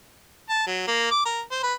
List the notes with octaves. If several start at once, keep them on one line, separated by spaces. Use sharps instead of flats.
A5
F#3
A#3
D6
A#4
C5
B4